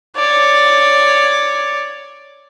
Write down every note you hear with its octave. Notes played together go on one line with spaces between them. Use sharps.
C#5 D5